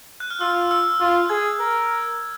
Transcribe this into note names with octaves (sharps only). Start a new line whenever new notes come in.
F#6
F6
F4 E6
E6
F4
G#4 G#6
A#4